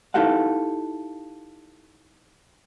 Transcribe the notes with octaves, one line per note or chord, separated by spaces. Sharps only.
D#4 E4 G4 A4 F5 F#5